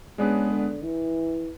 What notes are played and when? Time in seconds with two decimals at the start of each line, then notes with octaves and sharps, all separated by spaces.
0.18 C#3 G#3 B3 D4 G#4 B4
0.51 D3
0.82 E3